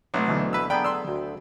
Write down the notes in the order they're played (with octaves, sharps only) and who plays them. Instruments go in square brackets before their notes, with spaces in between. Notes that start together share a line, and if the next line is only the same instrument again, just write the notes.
[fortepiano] B1 C3 [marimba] F#3 A3 [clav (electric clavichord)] C#5
[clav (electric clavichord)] D2 B2 E3 [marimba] D3 F#3
[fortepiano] B4 E6
[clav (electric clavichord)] D3 B3 G#4 [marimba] D5 A#5 [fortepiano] G5 B5
[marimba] D5 G5 [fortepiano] C6 E6
[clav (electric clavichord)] D2 [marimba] F#4